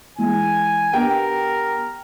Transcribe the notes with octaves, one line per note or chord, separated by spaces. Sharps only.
E3 G#3 G#5
B3 D4 G4 A#4 G5